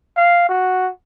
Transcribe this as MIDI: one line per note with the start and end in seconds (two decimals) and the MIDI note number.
0.17 0.46 77
0.49 0.91 66